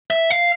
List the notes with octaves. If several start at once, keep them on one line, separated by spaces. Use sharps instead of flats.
E5
F5